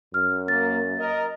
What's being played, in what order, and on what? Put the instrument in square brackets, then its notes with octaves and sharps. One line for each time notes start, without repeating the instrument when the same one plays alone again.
[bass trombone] F#2 [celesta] F6
[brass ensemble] A#3 [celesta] A6
[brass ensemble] A#4 D#5